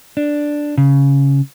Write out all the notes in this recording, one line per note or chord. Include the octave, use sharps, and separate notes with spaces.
D4
C#3